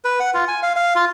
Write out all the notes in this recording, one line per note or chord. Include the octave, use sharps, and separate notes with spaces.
B4
F#5
F4
G#5
F5
F5
F4